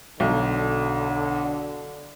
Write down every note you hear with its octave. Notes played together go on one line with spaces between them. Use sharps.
B1 D3